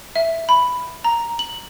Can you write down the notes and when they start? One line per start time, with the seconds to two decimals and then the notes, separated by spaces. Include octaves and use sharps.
0.16 E5
0.49 B5
1.04 A#5
1.39 F#7